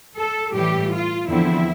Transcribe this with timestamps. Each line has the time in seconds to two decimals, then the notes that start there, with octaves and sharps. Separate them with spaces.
0.16 A4
0.54 A2 E3 G3 G4
0.92 F4
1.29 E2 D3 F3 C4 E4